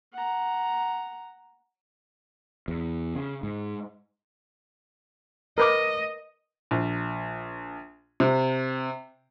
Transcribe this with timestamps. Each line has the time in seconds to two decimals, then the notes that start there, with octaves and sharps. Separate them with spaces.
0.13 F#5 A#5
2.68 E2
3.15 C#3
3.43 G#2
5.58 A#4 B4 D#5 D6
6.71 A#1
8.20 C3